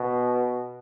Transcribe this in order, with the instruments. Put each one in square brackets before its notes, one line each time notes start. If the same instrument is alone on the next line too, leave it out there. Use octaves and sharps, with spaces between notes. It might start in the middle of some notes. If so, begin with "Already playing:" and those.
Already playing: [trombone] B2